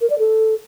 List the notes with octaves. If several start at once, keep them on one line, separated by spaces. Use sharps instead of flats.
A#4
D5
A4